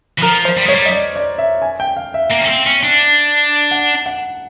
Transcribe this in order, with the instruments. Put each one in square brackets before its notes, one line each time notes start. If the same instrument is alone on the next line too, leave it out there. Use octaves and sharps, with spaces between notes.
[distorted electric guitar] E3
[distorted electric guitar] F3 [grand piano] A#4
[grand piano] C5
[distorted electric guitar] G3
[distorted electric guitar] G#3 [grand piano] C#5
[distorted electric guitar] G3
[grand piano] D#5
D5
D5
E5
G#5
G5
F5
E5
[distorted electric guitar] A#3
C#4
C4
C#4
D4
[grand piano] F#5
F#5